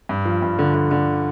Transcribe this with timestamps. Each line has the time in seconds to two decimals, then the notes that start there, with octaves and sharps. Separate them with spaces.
0.09 G2
0.25 F3
0.42 G2
0.59 D3
0.74 D3
0.91 D3